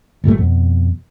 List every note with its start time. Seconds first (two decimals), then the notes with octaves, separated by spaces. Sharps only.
0.24 G1 A#2 G3 A3
0.38 F2 B2